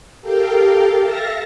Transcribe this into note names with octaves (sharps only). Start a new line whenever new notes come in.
G4 A4 A#4 F5 G5
A4 E5 F5 A5 A#6